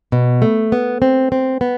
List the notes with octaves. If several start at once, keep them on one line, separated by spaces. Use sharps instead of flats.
B2
A3
B3
C4
C4
B3